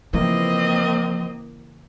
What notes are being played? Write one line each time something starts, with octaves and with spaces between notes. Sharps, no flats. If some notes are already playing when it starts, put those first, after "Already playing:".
C#3 E3 F3 A#3 C4 E4 D#5